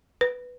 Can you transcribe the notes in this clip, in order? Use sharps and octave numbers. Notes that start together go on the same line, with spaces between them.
B4